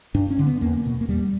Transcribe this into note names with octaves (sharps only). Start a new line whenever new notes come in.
G2 D4
C#4
D3
B3
E2 A#3
B2
A#3
E2 G3